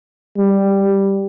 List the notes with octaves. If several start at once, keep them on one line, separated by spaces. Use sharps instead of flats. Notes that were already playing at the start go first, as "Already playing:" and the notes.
G3